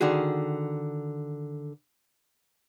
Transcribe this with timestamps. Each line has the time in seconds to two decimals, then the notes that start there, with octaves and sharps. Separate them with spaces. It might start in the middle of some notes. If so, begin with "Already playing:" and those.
0.01 D3 D#3 F#4 G#4